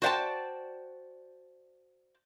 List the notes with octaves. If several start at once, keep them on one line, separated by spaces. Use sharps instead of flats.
F#4 C5 D5 E5 G5 A5